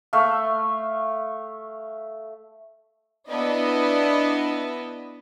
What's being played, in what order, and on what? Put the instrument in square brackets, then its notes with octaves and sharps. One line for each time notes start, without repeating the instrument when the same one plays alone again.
[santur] A3 E5 F5
[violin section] B3 D4 E4 D#5